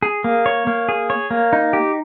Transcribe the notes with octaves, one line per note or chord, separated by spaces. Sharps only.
G#4
A#3
C#5
A#3
G#4
C#5
A#3
D#4
G4